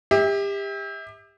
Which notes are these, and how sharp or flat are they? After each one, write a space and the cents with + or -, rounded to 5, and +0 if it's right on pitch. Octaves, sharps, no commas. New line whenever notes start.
G4 +30 E5 -30